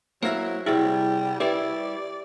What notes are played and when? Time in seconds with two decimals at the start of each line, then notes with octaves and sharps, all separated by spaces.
0.23 F#3 A#3 E4 C5 E5 A#6
0.66 C2 G3 E4 G#4 E5
1.40 G3 E4 G4 B4 D5 A6